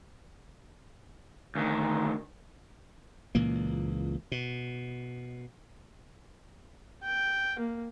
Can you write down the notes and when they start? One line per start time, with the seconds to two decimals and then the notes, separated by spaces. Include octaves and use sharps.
1.55 D2 D#3
3.35 C#2 A#2 E3 A#3
4.32 B2
7.03 G5
7.59 A#3